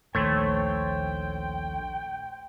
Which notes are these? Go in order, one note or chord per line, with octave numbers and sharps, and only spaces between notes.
A#1 D#2 A3 C5 C#5 G5